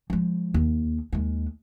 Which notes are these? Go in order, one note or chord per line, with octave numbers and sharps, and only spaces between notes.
F3 G#3
D#2
D#2 G#3